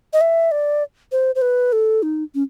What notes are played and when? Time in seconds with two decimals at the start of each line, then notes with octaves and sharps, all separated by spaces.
0.13 D#5
0.21 E5
0.51 D5
1.12 C5
1.35 C5
1.42 B4
1.72 A4
2.03 D#4
2.35 C#4